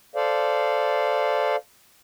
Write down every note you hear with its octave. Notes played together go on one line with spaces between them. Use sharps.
A4 C5 D5 F5